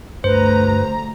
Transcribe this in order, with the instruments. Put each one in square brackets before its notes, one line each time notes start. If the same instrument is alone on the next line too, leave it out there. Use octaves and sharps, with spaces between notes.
[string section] D2 A#5 [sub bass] G2 [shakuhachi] B4 [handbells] C5